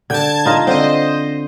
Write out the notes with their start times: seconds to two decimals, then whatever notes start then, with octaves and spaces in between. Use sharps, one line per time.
0.10 D3 G5 A5 G#6
0.46 D#4 F4 D#5
0.67 D3 C4 C5 D#5